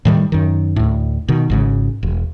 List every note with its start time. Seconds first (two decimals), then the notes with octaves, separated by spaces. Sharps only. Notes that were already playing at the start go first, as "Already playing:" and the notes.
0.05 A2 D#3 G3
0.32 F#2 D#3
0.76 D2 A2
1.29 B2 D#3
1.50 G#1 G#2 C#3
2.03 E1